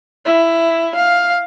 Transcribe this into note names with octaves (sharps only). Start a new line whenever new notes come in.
E4
F5